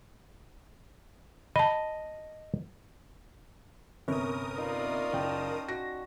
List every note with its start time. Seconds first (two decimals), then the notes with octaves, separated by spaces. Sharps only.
1.56 D#5 A5 B5
4.08 G1 C3 C#4 A#4 D#6
4.58 D#4 F4 D5
5.13 F#1 G5 A5
5.69 F#4 A#6